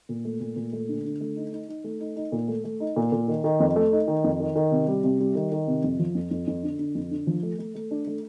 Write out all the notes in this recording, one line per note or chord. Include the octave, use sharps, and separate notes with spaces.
A#2
A3
A#2
A#2
A3
D3
D3
A3
D#4
D#4
D#4
A3
D#4
D#4
A#2
A3
A3
D#4
A#2
A#2
D#3
D#3
F2
A3
D#4
D#3
F2
D#3
D#3
C3
G3
C3
G3
D#3
D#3
C3
F2
F3
F2
F2
F2
D3
D3
F2
D3
F3
A3
A3
A3
D4
A3